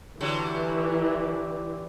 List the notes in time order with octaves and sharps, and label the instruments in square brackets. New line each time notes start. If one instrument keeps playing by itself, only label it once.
[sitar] D3 F#3 G3 [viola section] E3